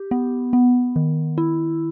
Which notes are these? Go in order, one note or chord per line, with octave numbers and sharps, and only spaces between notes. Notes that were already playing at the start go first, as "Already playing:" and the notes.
Already playing: G4
B3
B3
D#3
E4